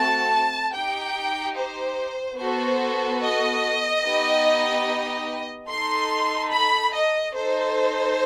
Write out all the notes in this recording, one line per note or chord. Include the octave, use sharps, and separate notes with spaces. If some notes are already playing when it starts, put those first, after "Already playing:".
Already playing: A3 C4 F#4 A4 A5
D#4 G4 G5
C5
B3 F#4 A4 C5
D#5
B3 D#4 G4
D#4 A4 C6
B5
D#5
D#4 A4 C5